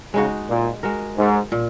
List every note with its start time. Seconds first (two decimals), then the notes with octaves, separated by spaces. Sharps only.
0.14 C#3 G#3 D#4 F#4
0.49 A#2
0.83 G#3 F#4 A#4
1.18 G#2
1.52 A#2